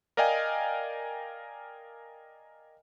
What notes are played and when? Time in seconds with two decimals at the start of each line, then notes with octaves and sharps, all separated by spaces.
0.17 A#4 D5 D#5 F5 G5 G#5